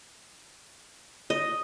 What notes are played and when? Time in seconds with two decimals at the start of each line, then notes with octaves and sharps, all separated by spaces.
1.30 D#5